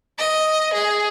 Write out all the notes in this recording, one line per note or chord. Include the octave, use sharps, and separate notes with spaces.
D#5
G#4